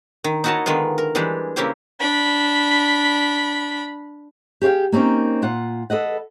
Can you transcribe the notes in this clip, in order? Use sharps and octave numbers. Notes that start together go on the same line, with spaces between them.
D#3
D#4 E4 F#4 C#5 D#5 A5
D3 D#3 G#3 B3 F4
A#4
E3 G3 G#3 D4 G4
C#3 A#3 C4 E4 G4 C5
D4 B5
G4 G#4 C#5 F5 G5
A#3 C4 C#4 D#4 A#4
A#2 F4 F#5
A4 B4 D#5 F#5